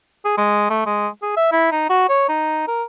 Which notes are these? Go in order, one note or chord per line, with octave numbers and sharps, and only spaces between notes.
G#4
G#3
A3
G#3
G#4
E5
E4
D#4
F#4
C#5
D#4
A#4